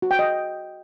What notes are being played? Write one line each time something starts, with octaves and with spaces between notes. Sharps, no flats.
F#4
G5
D#5